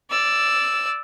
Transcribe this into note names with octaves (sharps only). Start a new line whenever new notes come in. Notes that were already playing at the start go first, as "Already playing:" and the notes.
D5 E6